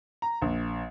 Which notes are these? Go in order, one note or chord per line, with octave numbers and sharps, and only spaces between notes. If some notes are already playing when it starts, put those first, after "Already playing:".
A#5
A#1